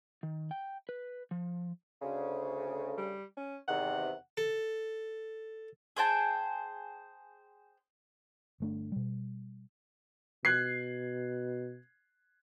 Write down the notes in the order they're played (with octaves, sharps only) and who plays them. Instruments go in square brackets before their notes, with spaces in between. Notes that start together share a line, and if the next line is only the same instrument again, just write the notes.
[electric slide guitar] D#3
G5
B4
F3
[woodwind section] D2 C#3
[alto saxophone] G3
C#4
[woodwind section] E2 C3 D#3 [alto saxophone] F#5
[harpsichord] A4
[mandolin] G#4 C5 G5 A5
[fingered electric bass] G1 A3 D4
B2 G3
[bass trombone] B2 [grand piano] F#6 G#6 C7